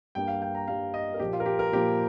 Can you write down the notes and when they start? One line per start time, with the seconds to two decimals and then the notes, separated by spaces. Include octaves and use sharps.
0.15 G2 G3 A#3 G5
0.28 F5
0.42 G5
0.55 A#5
0.68 G2 G3 A#3 F5
0.94 D#5
1.14 A#4
1.20 A#2 F3 A#3 G4
1.33 F4
1.40 A#4
1.46 G4
1.59 A#4
1.72 A#2 F3 A#3 G4